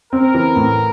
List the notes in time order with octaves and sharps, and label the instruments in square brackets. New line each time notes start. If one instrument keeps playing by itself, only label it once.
[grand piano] C4 [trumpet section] A#4
[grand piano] E3
A2